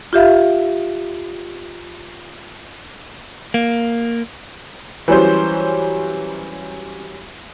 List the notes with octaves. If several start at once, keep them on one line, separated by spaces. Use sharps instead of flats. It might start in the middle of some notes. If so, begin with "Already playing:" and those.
F4 G4 E5 F5
A#3
E3 F#3 G3 C#4 C5